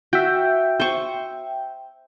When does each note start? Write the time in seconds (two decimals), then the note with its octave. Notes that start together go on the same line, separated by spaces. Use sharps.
0.13 F#4 E5 G5
0.80 C5 C#6